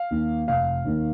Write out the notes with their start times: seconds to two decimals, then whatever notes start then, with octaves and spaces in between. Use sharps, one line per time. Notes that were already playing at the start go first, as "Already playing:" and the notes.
Already playing: F5
0.11 D#2 D#3 A#3
0.48 F1 F5
0.85 D#2 D#3 A#3